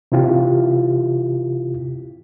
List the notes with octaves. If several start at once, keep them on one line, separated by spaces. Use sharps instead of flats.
C3 E3 E4 F4 G4